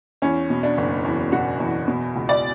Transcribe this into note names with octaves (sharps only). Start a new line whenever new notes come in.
E2 C#4
B2
D4
F#1
E2
B2 F#4
E2
B2
C#2
D5